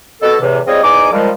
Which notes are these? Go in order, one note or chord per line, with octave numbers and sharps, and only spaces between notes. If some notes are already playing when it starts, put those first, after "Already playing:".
B2 A4
E2 A2 C3 E3
G3 G#3 C4 F4 C#5 D#5
E2 G#2 D#4 G#5 D6
D#3 F3 G3 G#3